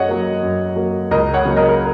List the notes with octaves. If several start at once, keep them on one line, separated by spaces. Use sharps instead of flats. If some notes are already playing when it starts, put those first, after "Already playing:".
Already playing: F#2 C#5 D#5 F#5
F#3 A#3
F#2
F#3 A#3
C#2 A#4 D#5
C#5 F#5
C#3 F#3 A#3
A#4 D#5
A#4